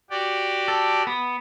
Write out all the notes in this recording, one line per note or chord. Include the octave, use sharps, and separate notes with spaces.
F#4 G4 D5
A4
B3